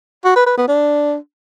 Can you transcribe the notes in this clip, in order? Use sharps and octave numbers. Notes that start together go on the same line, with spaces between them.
F#4
B4
B4
B3
D4